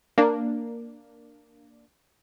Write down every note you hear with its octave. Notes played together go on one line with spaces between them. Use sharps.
A#3 D4